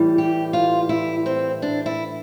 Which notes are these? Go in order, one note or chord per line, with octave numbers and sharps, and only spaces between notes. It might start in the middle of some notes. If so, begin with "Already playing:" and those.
Already playing: A2 E3 G3
G4
F4
E4
C4
D4
E4